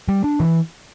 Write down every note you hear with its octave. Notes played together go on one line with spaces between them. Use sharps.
G3
D4
E3